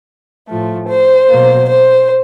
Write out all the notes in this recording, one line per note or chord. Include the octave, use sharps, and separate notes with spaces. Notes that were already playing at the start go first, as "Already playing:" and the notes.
A2 F3 A3
C5
B2 F#3 A#3
C5